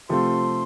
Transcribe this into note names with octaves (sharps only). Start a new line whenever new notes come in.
C3 F3 A3 C4 F4 C6